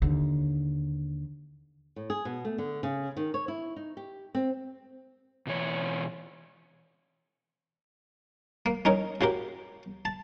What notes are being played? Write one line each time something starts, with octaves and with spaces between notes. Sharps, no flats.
D#2 D3
A2
G#4
B2
A3
D3
C#3
D#3
C#5
E4
D#4
G4
C4
B2 E3 C#5
A#3
C#4 D#4 A#4 C#5
C#3 F#4 G4 A#4
A5